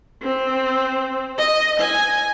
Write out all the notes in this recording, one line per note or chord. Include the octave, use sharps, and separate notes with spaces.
C4
D#5
G#5